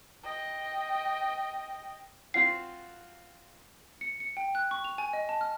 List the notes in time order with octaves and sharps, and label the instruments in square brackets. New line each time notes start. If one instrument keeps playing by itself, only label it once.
[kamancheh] D#5 G5
[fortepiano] C4 F4 F#4 [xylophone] C7
[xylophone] C#7
C#7
G5
F#6
C#6
F7
G#5
D#5
A5
F6